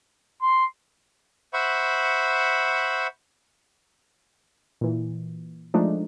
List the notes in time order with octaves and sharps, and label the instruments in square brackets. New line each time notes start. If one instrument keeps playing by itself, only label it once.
[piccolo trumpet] C6
[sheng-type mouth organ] C5 E5 F#5 B5 C#6
[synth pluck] A#2 E3
F3 G#3 A3 D4 D#4